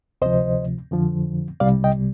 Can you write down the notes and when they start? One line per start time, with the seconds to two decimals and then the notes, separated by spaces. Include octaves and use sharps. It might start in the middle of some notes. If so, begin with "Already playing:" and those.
0.22 D2 C3 F3 C5 D#5
0.91 F2 D3 F3
1.60 C2 C3 G3 D5 F5
1.84 D#5 G5